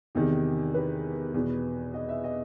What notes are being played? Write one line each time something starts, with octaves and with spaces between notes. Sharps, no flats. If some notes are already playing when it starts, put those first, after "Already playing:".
E2 C3 D#3 G4
B4
E2 B2
D#5
E5
D#5